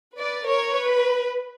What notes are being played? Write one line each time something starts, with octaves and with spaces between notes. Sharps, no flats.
B4 D5
A#4 C#5
B4